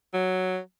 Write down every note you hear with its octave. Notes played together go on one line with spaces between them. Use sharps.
F#3